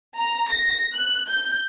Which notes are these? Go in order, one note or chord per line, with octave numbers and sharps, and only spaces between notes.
A#5
A#6
F#6
G6